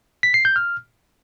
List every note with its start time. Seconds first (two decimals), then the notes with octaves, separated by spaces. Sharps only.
0.23 B6
0.34 C7
0.45 G6
0.56 F6